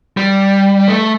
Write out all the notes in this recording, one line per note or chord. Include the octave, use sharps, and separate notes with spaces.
G3
A3